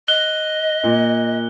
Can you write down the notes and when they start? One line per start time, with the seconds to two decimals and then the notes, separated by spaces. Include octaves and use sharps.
0.08 D#5 F#6 G7
0.84 A#2